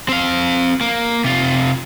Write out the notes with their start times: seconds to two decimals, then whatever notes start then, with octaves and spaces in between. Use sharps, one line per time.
0.09 C4 F5
0.81 A#3
1.24 C3 F4